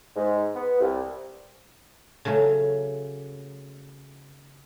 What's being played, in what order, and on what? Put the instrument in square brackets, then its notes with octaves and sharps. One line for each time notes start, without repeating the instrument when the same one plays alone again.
[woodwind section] G#2
B3
C2
[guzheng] C#3 F#3 A3 C#4